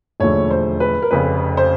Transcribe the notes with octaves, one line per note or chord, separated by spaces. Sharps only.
E1 D#2 D3 F3 A3 C#5
C5
B4
A#4
F1 F2 C#3 B4
C5